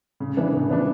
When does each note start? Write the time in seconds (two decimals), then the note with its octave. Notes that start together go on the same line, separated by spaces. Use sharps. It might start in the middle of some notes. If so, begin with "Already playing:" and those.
0.20 C#3
0.37 E3 B3 D4
0.53 C#3
0.70 E3 B3 D4